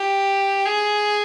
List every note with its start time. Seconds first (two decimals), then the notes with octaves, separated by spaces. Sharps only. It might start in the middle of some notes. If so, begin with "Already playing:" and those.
Already playing: G4
0.66 G#4